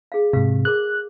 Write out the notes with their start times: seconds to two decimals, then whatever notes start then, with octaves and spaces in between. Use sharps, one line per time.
0.12 G#4 F5
0.33 G#2 C3 F5
0.65 G#4 A#4 D6 F#6